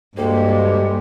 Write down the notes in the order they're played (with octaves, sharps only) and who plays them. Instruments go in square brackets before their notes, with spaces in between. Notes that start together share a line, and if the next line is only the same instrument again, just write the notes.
[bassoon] D2 [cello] G2 [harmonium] G#3 G4 [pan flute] A#3